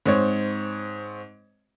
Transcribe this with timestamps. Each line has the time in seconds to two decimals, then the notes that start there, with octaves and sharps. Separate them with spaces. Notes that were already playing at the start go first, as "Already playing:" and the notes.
0.06 G#2 C4 C#5